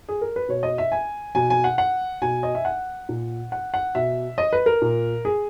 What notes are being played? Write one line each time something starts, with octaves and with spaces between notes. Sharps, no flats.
G#4
A#4
B4
B2 C#5
D#5
E5
G#5
B2 G#5
G#5
F#5
F#5
B2 G#5
D#5
E5
F#5
A#2
F#5
F#5
B2 E5
D#5
B4
A#4
A#2
G#4